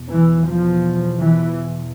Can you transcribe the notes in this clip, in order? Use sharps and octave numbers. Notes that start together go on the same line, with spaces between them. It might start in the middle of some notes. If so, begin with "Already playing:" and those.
Already playing: E2 B2
E3
F3
E3